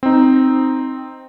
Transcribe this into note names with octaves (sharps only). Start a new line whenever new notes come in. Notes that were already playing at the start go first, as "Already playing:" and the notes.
C4 D#4